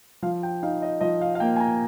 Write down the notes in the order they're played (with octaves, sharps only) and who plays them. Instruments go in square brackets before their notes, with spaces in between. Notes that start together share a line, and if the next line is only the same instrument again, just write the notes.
[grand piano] F3 F5
G5
D#4 F5
D#5
F3 D#5
F5
F5
A#3 G5
G#5
A#5